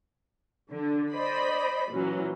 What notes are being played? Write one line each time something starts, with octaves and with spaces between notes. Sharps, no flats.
D3
C5 D5 D#5 B5
A#2 E3 F#3 C#4